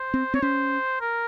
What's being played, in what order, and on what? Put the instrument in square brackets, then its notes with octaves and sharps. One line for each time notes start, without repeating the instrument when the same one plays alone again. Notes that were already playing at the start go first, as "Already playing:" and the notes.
Already playing: [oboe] C5
[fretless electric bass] C4
[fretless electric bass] C4 [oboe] C#5
[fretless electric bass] C#4 [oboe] C5
[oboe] A#4